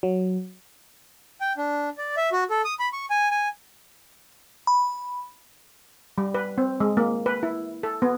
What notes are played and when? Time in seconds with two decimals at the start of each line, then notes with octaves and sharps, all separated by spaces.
0.03 F#3
1.41 G5
1.57 D4
1.98 D5
2.17 E5
2.32 F#4
2.50 A4
2.65 D#6
2.80 B5
2.93 C#6
3.10 G#5
3.31 G#5
4.67 B5
6.18 G3
6.34 B4
6.58 C4
6.80 G#3
6.97 A#3
7.26 B4
7.43 E4
7.83 A4
8.02 B3